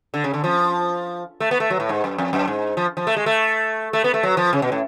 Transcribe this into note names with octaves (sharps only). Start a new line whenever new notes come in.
D3
C#3
D3
F3
A3
B3
A3
F#3
A2
G#2
F#2
F2
F#2
G#2
F3
F3
A3
G#3
A3
A3
B3
A3
F#3
F3
C#3
B2
A2